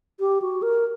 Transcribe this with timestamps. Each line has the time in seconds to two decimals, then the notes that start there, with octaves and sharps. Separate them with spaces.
0.20 G4
0.42 F#4
0.62 A#4